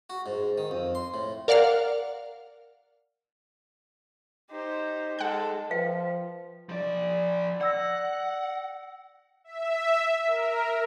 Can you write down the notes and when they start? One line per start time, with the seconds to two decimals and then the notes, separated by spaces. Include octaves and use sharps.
0.10 F#4
0.26 G#2
0.58 D#3
0.71 F2
0.95 C6
1.14 A2
1.48 A#4 D5 F5 F#5 F6
4.51 D#4 G4 C5
5.19 G#3 A4 F#5 F#6
5.70 F3 B4 F5 G5
6.69 F3 D5
7.61 D5 F#5 E6 A#6
9.44 E5
10.27 A#4